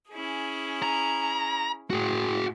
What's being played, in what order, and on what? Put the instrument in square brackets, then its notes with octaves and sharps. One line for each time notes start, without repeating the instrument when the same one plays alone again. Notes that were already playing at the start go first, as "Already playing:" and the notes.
[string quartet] C#4 E4 G#4
[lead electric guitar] A#5
[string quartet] A2 [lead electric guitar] F#4 G#4